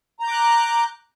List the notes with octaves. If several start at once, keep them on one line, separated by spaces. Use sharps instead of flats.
A#5 D6 F#6 G6